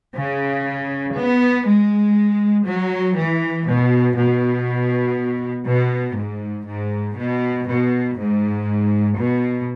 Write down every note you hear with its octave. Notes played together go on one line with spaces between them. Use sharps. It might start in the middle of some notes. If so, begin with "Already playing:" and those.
C#3
B3
G#3
F#3
E3
B2
B2
B2
G#2
G#2
B2
B2
G#2
B2